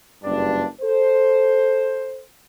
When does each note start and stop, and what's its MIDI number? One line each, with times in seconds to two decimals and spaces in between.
0.24 0.64 30
0.24 0.64 43
0.24 0.64 62
0.82 2.23 69
0.82 2.23 72